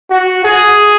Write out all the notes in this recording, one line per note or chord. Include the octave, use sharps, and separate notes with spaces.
F#4
G#4